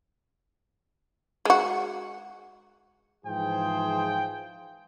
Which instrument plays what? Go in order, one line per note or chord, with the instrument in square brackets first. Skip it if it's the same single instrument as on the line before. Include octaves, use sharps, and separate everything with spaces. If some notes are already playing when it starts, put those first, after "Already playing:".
[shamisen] G#3 F#4
[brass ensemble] G#2 E3 F3 G#4 C5 G5